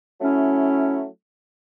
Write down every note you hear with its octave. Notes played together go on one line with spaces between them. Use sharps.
F#3 A3 C#4 E4